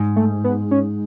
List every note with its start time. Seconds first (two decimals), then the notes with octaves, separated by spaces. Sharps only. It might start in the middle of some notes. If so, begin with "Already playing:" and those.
Already playing: G#2
0.16 A3
0.44 B3
0.71 C#4